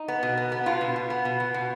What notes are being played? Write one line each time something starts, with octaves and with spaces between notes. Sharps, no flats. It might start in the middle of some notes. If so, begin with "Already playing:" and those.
Already playing: D#4
B3
B2
B3
B3
B2 F4
B2
B2
B3
B2
B2
B2